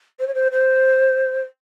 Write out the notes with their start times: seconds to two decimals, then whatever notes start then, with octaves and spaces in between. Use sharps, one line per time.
0.19 C5
0.27 C#5
0.34 C5
0.51 C5